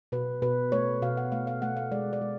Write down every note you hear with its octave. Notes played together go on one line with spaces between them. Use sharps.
B2 B4
B2 B4
A3 C#5
B2 F5
F#5
A3 F5
F5
A3 F#5
F5
G#3 D5
D5
G#3